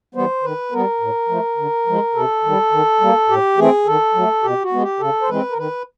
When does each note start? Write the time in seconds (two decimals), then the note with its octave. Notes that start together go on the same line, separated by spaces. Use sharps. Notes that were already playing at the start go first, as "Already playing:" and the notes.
0.15 E3 G3 B3 C5
0.43 D#3 B4
0.72 G3 B3 A#4
1.00 A2
1.29 F3 A3
1.57 D3
1.87 F3 G#3
2.15 C3 A4
2.44 D#3 G3
2.72 D#3
3.01 G3 A#3
3.29 A2 G4
3.57 E3 A3 C4 G#4
3.86 D#3 A4
4.14 F#3 A3
4.43 B2 G4
4.63 F#4
4.72 G#3 B3
4.81 G4
5.00 C#3 A4
5.22 C5
5.29 E3 G#3 C4 B4
5.50 A#4
5.58 D#3 B4